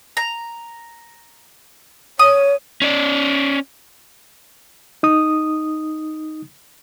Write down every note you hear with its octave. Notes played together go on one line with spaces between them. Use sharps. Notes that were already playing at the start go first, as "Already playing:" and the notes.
A#5
C#5 D#6
C#4 D5
D#4 D#6